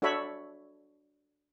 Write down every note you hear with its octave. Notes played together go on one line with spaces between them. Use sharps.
D4 F#4 A4 C#5 E5 B5